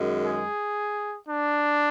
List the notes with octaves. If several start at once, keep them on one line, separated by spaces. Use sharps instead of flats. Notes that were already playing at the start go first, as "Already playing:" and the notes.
Already playing: F#2 D#3 G#3
G#4
D4